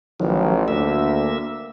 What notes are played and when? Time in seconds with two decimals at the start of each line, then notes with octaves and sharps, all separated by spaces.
0.20 A1 D#3 F3 F#3
0.68 D2 A#3 E5